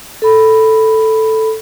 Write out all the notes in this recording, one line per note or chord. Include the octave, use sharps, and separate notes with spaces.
A4 B5